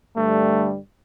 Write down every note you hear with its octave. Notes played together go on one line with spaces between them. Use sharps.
G2 D3 G3 A3